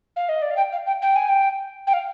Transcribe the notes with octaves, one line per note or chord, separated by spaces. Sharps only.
F5
D#5
D5
F5
G5
F5
G5
G5
G#5
G5
G5
F5